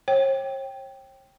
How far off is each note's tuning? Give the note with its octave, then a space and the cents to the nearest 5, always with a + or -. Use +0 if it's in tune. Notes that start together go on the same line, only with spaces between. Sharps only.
C#5 -40 G5 +0